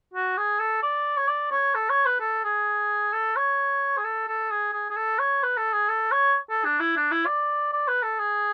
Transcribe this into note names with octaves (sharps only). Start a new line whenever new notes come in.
F#4
G#4
A4
D5
C#5
D5
C#5
A4
C#5
B4
A4
G#4
A4
C#5
G#4
A4
A4
G#4
G#4
G#4
A4
C#5
B4
A4
G#4
A4
C#5
A4
D4
E4
D4
E4
D5
D5
B4
A4
G#4